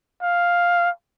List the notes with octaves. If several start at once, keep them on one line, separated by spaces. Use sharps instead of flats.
F5